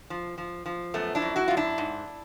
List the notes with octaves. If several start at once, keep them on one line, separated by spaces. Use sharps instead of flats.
F3
F3
F3
F#2 A3 B3
D4 E4
F#2
E4 F#4
F#2 F4
D4 E4
G#2